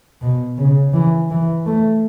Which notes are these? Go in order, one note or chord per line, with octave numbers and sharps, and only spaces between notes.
B2
C#3
E3
E3
A3